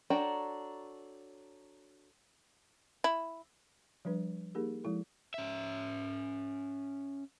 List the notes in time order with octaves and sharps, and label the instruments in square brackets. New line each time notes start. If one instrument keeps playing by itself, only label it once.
[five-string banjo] D4 F#4 G5 [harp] A4 C#5 A#5
[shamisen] E4
[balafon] F3 G3 D4 B4
A#3 D#4 G4 G#4 A#4
F3 G#3 E4 A4
[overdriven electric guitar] C#4 E5